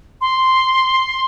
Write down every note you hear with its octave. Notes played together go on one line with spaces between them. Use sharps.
C6